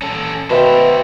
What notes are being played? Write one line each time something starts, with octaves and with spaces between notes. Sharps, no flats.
C#4 A4
B2 F#4 B4 C5 E5 G5